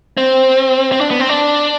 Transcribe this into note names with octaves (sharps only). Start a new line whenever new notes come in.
C4
C4
D4
B3
C4
D4